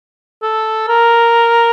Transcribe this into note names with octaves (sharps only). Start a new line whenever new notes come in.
A4
A#4